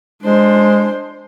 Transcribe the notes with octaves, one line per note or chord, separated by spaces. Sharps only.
G#3 D4 C5